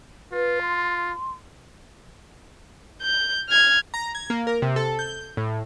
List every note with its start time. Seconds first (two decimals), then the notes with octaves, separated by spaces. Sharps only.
0.32 F4 B4
0.62 C6
3.02 G6
3.49 F6 G#6
3.94 A#5
4.15 G#6
4.30 A#3
4.47 A#4
4.62 C3
4.76 A4
4.99 G6
5.37 A2